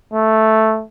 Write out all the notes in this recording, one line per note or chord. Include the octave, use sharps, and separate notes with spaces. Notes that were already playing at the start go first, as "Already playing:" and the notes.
A3